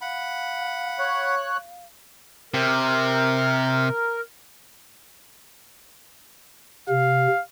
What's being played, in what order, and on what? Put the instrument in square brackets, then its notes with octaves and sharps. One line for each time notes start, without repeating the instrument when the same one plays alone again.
[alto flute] F5 [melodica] F#5 B5
[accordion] C#5 F#6
[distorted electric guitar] C3 [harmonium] A#4
[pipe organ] C3 [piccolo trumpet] F5